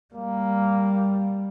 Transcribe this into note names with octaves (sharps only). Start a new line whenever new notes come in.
G3 A#3